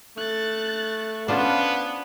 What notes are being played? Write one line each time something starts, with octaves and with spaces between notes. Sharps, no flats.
A3 F#6 A6
B3 C#4 D4 F4 C5